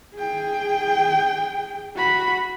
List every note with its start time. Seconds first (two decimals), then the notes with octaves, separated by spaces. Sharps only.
0.16 G#4 G5
1.95 F#4 B5